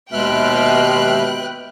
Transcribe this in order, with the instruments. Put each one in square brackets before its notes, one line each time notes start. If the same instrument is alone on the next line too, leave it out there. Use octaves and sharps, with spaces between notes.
[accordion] D#2 E5 F6 [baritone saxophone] B2 [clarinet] G#3 [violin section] B4 G5 F#6